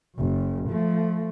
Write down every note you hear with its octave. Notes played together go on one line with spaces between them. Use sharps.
F#1 F#2
F3 A3